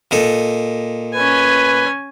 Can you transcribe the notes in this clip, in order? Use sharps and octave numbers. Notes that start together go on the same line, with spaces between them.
A#2 D#4 A4
C#4 B4 G#5